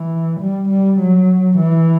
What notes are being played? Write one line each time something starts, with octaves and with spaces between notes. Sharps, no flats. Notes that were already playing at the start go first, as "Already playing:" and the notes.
Already playing: E3
G3
G3
F#3
E3